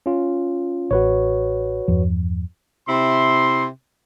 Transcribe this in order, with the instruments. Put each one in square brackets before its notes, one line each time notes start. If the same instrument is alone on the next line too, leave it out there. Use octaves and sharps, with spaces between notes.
[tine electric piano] C#4 F4
[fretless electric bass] A1 [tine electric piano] F#4 B4 C#5
[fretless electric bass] E2 G2 F3
[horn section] C3 E4 C6